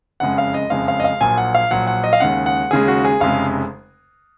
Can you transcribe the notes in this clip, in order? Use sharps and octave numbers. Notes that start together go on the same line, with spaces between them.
F#1 F2 C#3 G#3 F#5
F5
D#5
F#1 F2 C#3 G#3 F5
F5
D#5
F5
A#1 A#2 F#3 G#5
F#5
F5
A#1 A#2 F#3 F#5
F#5
D#5
F5
D#2 C#3 G#3 F#5
F#5
D#2 C#3 G#3 G#4
F#4
G#4
F1 F2 C#3 G#3 F5